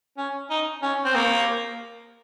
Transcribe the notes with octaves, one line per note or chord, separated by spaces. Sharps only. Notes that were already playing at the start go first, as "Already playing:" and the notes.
C#4
D#4
C#4
C4
A#3